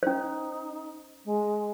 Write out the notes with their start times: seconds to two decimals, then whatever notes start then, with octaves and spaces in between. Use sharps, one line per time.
0.03 C#4 D#4 C5
1.25 G#3